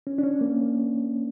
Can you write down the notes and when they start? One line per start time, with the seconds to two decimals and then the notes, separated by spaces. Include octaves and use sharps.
0.07 C#4
0.18 D4
0.23 C#4
0.41 A#3